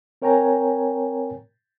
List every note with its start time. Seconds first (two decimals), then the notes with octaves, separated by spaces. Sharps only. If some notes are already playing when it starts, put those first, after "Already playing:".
0.22 C4 A#4 C#5 G5 G#5 A#5